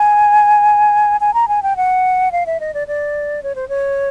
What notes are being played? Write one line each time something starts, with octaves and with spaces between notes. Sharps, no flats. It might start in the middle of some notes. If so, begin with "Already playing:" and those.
Already playing: G#5
G#5
A#5
G#5
G5
F#5
F5
E5
D#5
D5
D5
C#5
C5
C#5